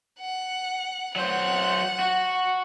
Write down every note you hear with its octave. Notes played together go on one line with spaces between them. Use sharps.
F#5
F#3 C5 F#5
F#4